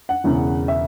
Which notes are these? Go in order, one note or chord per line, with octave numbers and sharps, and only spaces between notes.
F#5
E1 E2 C#3 E3
E5